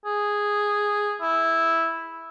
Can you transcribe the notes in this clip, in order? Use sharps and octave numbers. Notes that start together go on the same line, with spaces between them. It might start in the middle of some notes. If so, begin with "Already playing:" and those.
G#4
E4